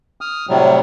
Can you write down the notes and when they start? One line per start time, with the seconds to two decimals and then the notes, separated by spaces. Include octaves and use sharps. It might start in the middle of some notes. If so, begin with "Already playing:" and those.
0.21 D#6 F6
0.49 A2 C3 F#3 G3